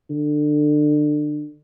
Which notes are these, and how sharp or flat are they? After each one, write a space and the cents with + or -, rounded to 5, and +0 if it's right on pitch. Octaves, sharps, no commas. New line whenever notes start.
D3 +25